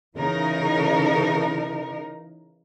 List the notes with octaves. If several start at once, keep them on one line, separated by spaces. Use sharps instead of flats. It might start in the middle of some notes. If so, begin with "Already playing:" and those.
C#3 E3 D#4 A#4